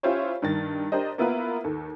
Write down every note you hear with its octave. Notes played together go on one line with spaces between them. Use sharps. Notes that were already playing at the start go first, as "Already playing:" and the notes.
C#4 E4 F4 G4 C5 C#5
G2 D#3 A6
D4 G4 A#4 C5 D#5
A#3 B3 E4 F4 A#4 B4
D#2 A4